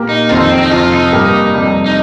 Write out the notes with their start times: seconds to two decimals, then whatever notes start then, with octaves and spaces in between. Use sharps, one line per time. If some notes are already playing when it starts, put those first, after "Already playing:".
Already playing: A#2 A#3 G4 A#4
0.09 D#4
0.29 F2 D#3 C4 F4
0.40 D#4
0.50 C4
0.61 D#4
0.71 F2 C3 F3 F4
0.92 D#4
1.12 G2 G3 A#3 G4 A#4
1.54 F2 C3 G3
1.86 D#4